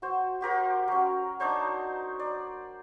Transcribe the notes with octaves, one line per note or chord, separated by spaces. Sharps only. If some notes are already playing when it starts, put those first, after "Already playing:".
F#4 C5
F#4 G4 A#4 C5
F#3 C#4
D4 D#4 C5 C#5
D5